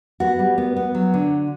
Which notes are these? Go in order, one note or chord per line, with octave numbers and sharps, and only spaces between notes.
B3 F#4
G3
B3
B3
F#3
D3